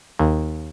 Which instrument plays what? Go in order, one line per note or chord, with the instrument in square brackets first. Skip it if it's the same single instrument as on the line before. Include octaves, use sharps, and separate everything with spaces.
[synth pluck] D#2